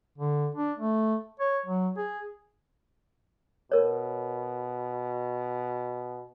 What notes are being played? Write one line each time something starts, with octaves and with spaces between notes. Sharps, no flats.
D3
D4
A3
C#5
F#3
G#4
B2 A#4 C#5